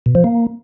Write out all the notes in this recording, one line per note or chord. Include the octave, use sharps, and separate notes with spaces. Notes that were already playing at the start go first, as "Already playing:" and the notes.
B2
F3
A#3